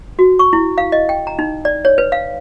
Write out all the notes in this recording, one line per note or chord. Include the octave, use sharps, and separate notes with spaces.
F#4
C#6
E4
F5
D#5
G5
A#5
D#4
D5
C#5
B4
F5